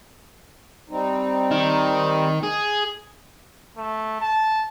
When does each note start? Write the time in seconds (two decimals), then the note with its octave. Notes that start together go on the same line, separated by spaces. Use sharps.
0.90 G3 C4 D#4
1.51 D#3
2.43 G#4
3.77 A3
4.21 A5